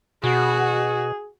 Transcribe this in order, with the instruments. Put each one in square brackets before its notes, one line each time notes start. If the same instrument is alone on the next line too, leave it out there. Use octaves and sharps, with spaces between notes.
[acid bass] B2 [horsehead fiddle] F#4 [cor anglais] G#4